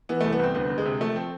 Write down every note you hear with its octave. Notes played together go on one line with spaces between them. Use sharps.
E3 B3
C2 A3
B3
C2 C4
D2 B3
D2
G#3
C3
F3 A3
C4